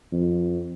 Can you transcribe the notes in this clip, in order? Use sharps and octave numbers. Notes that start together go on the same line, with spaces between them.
F2